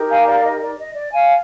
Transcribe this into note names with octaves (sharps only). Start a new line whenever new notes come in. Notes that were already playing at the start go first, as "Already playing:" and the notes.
Already playing: D#4 G4 A#4
F5 G#5
D5 F5
D#5
D5
D#5
D5
F5 G#5